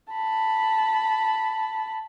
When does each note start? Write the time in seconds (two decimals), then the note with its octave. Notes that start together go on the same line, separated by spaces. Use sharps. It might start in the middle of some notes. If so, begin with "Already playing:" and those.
0.12 A5 B5